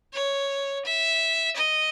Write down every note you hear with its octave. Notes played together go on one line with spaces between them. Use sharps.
C#5
E5
D#5